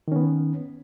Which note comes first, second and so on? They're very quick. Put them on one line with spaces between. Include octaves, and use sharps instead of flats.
D#3 C#4 B3